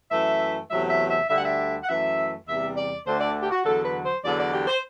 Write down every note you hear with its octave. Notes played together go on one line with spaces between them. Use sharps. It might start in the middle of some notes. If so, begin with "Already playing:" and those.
F#2 E3 A3 E5
E2 C3 F#3 A3 E5
E5
E5
D2 D3 G3 E5
F#5
E5
F#5
F#2 E3 A3 E5
E2 C3 G3 E5
D5
D2 D3 A3 C5
D5
G4
F#4
E2 D3 F#3 A4
B4
C5
E2 D3 F#3 D5
D5
G4
C5